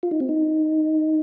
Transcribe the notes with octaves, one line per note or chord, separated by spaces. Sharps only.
F4
D#4
C4
D#4